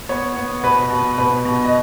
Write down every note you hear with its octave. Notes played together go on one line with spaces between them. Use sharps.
B3 C#5
B3
B2 B4
B2
B2 B4
B2
D#5